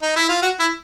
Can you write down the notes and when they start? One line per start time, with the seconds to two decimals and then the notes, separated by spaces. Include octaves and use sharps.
0.02 D#4
0.16 E4
0.29 F4
0.42 F#4
0.60 E4